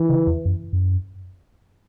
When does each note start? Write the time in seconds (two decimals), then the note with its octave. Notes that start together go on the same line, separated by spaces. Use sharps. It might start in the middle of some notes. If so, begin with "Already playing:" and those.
Already playing: E3
0.09 C#3
0.27 E2
0.45 F#2
0.73 F#2